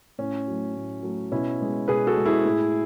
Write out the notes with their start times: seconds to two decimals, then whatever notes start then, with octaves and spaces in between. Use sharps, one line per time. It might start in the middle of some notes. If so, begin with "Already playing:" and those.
0.18 A2 C#4
0.48 F#3 A3
0.75 A2
1.03 F#3 A3
1.32 B2 C#4 E4
1.60 G#3 B3
1.88 B2 G#4 B4
2.07 F#4 A4
2.17 G#3 B3
2.26 E4 G#4
2.45 A2